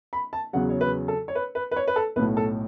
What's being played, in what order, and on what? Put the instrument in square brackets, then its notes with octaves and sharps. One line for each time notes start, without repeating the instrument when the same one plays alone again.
[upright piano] B5
A5
E2 C#3 F#3 F#5
C#5
B4
A4
C#5
B4
B4
B4
C#5
B4
A4
B1 A2 A3 B4
A4